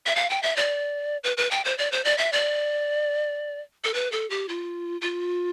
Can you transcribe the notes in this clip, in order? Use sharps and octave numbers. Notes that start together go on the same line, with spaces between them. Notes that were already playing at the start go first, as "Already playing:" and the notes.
E5
F5
G5
E5
D5
B4
B4
G5
C5
D5
C5
D5
E5
D5
A4
B4
A4
G4
F4
F4